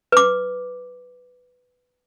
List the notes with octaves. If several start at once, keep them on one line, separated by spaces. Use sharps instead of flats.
B4 D6